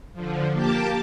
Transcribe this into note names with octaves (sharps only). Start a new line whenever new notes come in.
D3 F3
A#3 G4 A5 D6